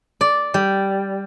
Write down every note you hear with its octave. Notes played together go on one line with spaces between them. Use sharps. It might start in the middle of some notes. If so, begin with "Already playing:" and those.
D5
G3